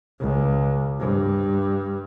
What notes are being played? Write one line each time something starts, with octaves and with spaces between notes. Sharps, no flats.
C#2
G2